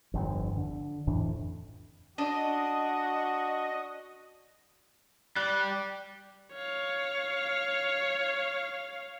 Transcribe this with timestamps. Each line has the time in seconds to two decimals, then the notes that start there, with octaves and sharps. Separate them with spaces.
0.14 G1 F2
0.57 D3
1.07 F2 A2 E3 D4
2.18 D4 F#4 D#5
5.36 G3 F#6
6.53 C#5 F5